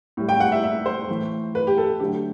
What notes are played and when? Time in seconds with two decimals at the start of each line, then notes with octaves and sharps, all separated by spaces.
0.17 A2 G3
0.29 G5
0.40 F#5
0.52 E5
0.64 E5
0.86 C5
1.09 A2 E3 A3
1.55 B4
1.67 G4
1.78 A4
2.00 D3 F#3 A3 G4